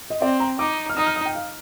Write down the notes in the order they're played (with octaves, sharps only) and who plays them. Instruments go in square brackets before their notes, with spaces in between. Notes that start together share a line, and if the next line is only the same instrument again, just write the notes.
[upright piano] D#5
[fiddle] C4 [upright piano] D5
[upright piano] A#5
[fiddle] D#4 [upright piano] D6
[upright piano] F6
[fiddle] D#4 [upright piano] D#6
[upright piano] F6
D#6
G5
F5